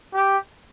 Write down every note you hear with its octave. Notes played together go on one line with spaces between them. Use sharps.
G4